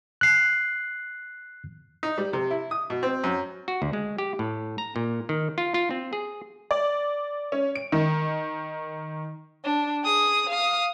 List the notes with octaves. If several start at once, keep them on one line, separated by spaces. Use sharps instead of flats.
F#6 C7
D#4
G3
C3
E4
D#6
B2
C4
F#2
F#4
D2
G#3
G4
A2
A#5
A#2
D#3
F4
F4
C4
G#4
D5
C#4
D7
D#3
D4
G#4 D#6
F5 D#6